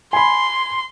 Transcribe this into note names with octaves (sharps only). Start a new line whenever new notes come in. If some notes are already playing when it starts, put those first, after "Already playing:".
G#5 B5 C6